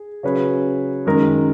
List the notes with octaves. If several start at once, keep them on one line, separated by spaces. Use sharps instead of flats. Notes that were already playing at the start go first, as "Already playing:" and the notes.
Already playing: G#4
C#3 F#3 C#4 G#4 B4
F#2 D#3 G#3 D#4 A#4